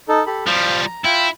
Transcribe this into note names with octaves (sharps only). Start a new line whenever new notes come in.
D#4 A4
G4 A4 B5
F3 G3 C5 F5
A#5
E4 F4 G5